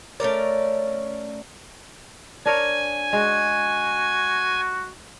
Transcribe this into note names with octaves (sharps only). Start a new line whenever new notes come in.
A3 C#4 A#4 D5
D4 A#4 C#5 G#5
G#3 F#4